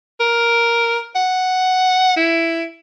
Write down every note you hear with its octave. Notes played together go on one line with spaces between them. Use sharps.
A#4
F#5
E4